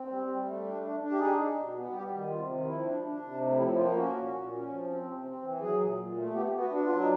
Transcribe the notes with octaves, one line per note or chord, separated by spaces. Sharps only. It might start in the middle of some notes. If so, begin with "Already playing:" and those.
Already playing: C4
G3
G3
A3
D4
D4
D4
G4
D#4 G#4
D#4
B2
B3
G3 G4
D#3
C3 F4
D#3
F3 E4
D4
D4
C3
A2 D#4
F3 E4
A#3 F4
C#4 F#4
A#2
A#2
C#4
F3
C4
C3
C4
E3
F#3 G#4
A#2
A#2
A3
B3 G4
B3
F#4
D4
F4
F#3
D#4